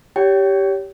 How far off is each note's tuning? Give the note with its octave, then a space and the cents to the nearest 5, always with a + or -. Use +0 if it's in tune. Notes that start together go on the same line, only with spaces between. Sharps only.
G4 -5 C#5 +25 G5 -25